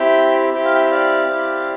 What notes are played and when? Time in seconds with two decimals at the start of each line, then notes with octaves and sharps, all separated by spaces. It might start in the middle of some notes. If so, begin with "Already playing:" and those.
Already playing: C4 E4 G4 E5 G5
0.54 C4 E4 G4 G5
0.65 F5
0.75 E5 G5
0.85 E5
0.91 D5 F5
1.28 C4 E4 G4